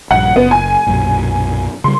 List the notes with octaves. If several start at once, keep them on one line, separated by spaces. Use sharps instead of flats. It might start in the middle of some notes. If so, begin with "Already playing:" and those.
A#1 G2 F#5
F#1 B3
G#5
B1 F#2 A#2
C#3 G3 C6